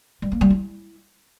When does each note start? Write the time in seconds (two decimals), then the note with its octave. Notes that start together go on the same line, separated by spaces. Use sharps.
0.22 G3
0.32 A#3
0.41 G3
0.50 E4